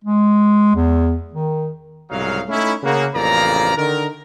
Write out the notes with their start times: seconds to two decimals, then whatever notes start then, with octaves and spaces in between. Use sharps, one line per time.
0.05 G#3
0.75 E2
1.34 D#3
2.10 C2 G#2 C#3 F#3 D#4 F5
2.49 A3 C#4 D#4 E4
2.83 C#3 A#3 F#4
3.14 A1 F2 C#3 A#3 D5 A#5
3.76 D3 D#3 D#4 A#4